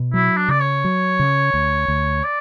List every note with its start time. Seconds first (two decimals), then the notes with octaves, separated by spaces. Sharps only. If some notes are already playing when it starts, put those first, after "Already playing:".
Already playing: B2
0.14 F#3 E4
0.37 D4
0.48 C#3 D5
0.60 C#5
0.84 F#3
1.19 C#3
1.54 D2
1.88 D2
2.24 D5